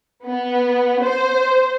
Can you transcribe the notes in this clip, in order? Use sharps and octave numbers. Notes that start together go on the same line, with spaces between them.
B3
C5